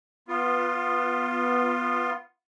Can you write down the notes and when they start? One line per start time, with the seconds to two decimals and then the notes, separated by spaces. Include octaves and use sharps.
0.28 B3 F4